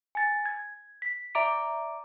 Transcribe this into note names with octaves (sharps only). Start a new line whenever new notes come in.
G#5 A6
G#6
B6
D5 E5 A#5 D6 D7